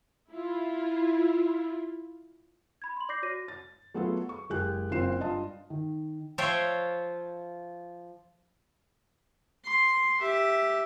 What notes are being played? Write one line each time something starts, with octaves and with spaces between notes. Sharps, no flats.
E4 F4
B5 G#6
C6 F#7
D5 D6 G6 A#6 C7
F#4 C#5 A#6 D#7
A6
F#3 A3 B3 F4 G#4 A4
C#6
F#1 G#3 G4 G#5 F#6
F#1 C#3 C4 F4 C7 E7
G2 F4 D#5 A5
D#3
F3 F4 C#5 E5 F5 G5
C6
G4 E5